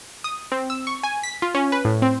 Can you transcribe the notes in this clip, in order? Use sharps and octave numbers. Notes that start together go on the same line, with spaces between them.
D#6
C4
E6
C#6
G#5
B6
F4
C#4
B4
A2
C4